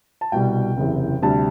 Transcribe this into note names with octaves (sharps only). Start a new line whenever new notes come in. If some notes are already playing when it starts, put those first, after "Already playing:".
A5
C2 B2 G3 G5
F#1 E2 C3
D2 C3 G3 A5